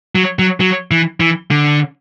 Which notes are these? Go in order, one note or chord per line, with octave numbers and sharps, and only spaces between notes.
F#3
F#3
F#3
E3
E3
D3